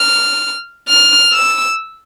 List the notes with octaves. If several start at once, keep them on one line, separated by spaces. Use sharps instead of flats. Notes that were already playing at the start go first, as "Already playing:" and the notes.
Already playing: F6
F6
E6